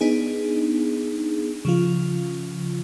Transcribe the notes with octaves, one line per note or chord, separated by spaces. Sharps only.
B3 D4 D#4 G#4
C#3 F3 F4